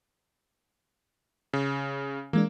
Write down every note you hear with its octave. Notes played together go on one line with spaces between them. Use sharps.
C#3
E3 G#3 A#3 D4